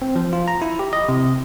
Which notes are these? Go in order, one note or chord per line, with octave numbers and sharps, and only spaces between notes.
C4
F3
F4
A#5
E4
G4
D#5
C3